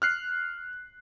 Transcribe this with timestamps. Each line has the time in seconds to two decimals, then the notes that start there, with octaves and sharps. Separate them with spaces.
0.02 F6 F#6 C7